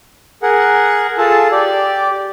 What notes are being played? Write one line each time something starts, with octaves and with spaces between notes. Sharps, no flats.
G#4 A#4 F#5
F4 G#4 A4 A5
G4 D5